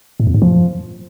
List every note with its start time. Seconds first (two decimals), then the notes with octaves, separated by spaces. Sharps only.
0.20 A2
0.27 F2
0.34 G#2
0.42 F3